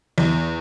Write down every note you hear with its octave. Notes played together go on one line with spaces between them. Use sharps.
E2